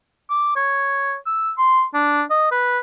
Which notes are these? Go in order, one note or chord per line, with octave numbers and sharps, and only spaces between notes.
D6
C#5
E6
C6
D4
D#5
B4